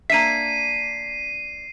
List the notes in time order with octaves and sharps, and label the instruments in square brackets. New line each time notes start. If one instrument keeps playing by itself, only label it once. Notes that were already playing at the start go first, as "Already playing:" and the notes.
[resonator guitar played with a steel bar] A#3 D4 E5 [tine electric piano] B6 [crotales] C7 D#7